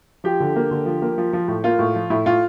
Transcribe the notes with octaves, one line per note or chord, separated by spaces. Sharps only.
F3 G4
D3
A#3
D3
F3
A#3
F3
F3
A2
A#3 F4
A2
F3
A2 E4
A2 F4